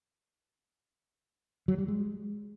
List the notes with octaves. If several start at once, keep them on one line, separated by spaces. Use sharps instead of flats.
F#3
G3
G#3